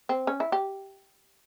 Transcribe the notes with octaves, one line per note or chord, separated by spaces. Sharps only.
C4
C#4
E4
G4